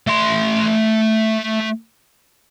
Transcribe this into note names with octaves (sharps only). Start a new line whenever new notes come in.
A3 C6